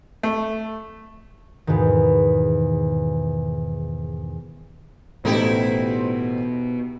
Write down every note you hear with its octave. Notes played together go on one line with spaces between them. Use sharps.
A3
E2 G#2 B2 D#3
A1 B2 A3 D#4 E4 G4 C5